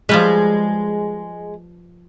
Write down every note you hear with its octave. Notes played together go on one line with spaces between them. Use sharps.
F3 G3 G#3 B4